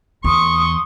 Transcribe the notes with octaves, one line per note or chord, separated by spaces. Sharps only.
E2 C6 C#6 D#6